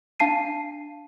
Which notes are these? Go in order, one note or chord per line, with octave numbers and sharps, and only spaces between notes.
D4 F5 A5 C7 D#7